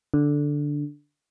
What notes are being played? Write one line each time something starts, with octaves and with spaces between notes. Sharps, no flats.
D3